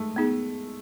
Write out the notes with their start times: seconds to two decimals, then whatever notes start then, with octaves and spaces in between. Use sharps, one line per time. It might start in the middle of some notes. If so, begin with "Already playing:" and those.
Already playing: G#3 A3
0.16 B3 D#4 G#4